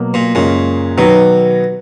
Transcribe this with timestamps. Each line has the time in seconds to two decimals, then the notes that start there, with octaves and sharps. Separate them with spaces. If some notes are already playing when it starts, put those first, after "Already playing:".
Already playing: B2 F#3 A#3
0.14 A#2
0.35 F#2 A#2 C#3 G#3 C#4
0.97 B2 D#3 F#3